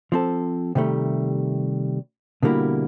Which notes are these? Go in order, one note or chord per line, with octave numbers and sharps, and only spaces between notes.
F3 C4 A4
C3 D#3 G3 A3
B2 D3 G3 A#3 E4